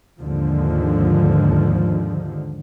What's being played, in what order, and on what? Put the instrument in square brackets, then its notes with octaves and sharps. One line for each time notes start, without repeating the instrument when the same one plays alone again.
[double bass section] D#2 G#2 D3 F3